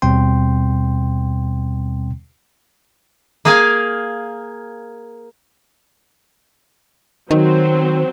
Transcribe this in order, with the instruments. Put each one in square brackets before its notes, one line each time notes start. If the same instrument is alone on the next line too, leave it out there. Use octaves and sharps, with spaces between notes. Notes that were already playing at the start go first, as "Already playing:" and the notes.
[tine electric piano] D#2 B2 G3 C4 G5 C6
[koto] A#3 G#4 A#4 F5 G#5
[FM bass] D#3 [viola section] F#3 C4